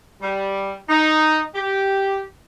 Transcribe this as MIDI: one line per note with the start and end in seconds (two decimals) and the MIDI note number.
0.21 0.73 55
0.89 1.41 63
1.55 2.24 67